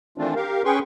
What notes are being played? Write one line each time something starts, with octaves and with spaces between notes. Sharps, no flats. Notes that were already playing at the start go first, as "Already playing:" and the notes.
D#3 E3 A3 C4 D4 F4
G4 A#4 F5
C#4 G#4 B4 G5 C6 C#6